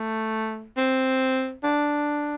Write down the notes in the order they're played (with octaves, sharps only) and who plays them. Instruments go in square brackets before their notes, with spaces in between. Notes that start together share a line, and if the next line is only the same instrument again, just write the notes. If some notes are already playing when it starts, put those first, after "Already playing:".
Already playing: [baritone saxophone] A3
C4
D4